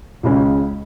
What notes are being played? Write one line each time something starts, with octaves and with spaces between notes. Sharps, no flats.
C#2 C#3 G#3 C#4